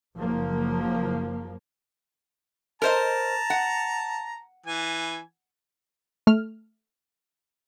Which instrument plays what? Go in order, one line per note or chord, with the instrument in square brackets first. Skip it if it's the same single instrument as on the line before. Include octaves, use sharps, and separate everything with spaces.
[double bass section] F#1 F3 A#3
[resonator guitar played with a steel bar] A#4 C5 D#5 [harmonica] A5 A#5
[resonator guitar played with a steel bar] F#5
[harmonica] E3 G#5
[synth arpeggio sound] A3 F6